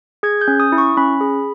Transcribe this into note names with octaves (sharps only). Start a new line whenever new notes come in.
G#4 G#6
G6
C#4
D#6
E4
C#6
C#4 B5
G#4